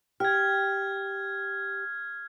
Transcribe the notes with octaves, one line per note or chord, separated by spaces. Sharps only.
G4 F6 G#6